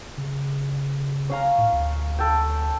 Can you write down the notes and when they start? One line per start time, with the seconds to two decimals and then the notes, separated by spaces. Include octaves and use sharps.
0.17 C#3
1.29 C#4 F5 A#5
1.58 A2
1.73 D2
2.19 A4 G5